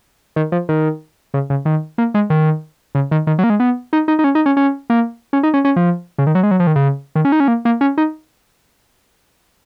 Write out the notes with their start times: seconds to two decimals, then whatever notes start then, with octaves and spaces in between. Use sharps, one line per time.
0.36 D#3
0.52 F3
0.69 D#3
1.34 C#3
1.50 C#3
1.65 D#3
1.98 A#3
2.14 G#3
2.30 D#3
2.95 C#3
3.11 D#3
3.27 D#3
3.39 F#3
3.44 A#3
3.50 G#3
3.60 B3
3.93 D#4
4.08 D#4
4.19 D#4
4.24 C#4
4.35 D#4
4.46 C#4
4.57 C#4
4.90 A#3
5.33 C#4
5.43 D#4
5.54 C#4
5.65 C#4
5.76 F3
6.18 C#3
6.27 D#3
6.35 F#3
6.43 G#3
6.51 F#3
6.60 F3
6.67 D#3
6.76 C#3
7.16 D#3
7.25 C#4
7.32 D#4
7.40 C#4
7.48 A#3
7.65 A#3
7.81 C#4
7.98 D#4